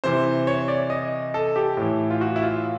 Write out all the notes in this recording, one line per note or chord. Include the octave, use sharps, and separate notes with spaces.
C3 E3 C5
C#5
D5
D#5
A4
G4
A2 E3
F4
F#4
E4
F4